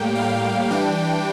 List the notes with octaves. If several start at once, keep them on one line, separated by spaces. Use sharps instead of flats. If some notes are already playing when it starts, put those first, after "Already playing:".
Already playing: A2 G3 A#3 G5
F5
E3 G3 D4 G5